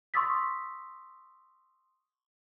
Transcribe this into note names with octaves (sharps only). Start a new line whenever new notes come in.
C6 C#6 D#6 E6 A6 B6